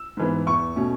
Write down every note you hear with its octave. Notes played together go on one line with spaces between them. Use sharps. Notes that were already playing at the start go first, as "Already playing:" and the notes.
Already playing: E6
G#2 E3 B3
E2 C#6
B2 A3 C#4